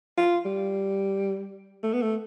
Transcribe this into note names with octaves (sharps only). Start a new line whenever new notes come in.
F4
G3
A3
B3
A3